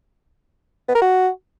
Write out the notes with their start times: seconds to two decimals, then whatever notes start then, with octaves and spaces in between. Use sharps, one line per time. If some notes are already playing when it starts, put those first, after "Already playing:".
0.88 B3
0.95 A#4
1.02 F#4